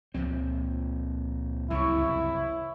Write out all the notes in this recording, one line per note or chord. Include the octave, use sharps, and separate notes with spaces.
C#2 A#2 F3 C4
F#1 C2 C#3 E3 E4 C#5 C#6